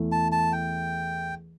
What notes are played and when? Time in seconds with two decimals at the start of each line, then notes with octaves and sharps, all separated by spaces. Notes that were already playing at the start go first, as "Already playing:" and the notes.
Already playing: E2 E3 A3 E4
0.12 A5
0.32 A5
0.52 G5